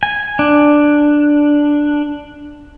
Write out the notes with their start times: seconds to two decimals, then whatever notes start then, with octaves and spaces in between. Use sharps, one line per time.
0.03 G#5
0.39 D4